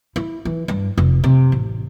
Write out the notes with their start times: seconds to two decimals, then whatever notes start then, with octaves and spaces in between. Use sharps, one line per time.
0.16 E4
0.45 E3
0.68 G2
0.97 F1
1.24 C3
1.52 A1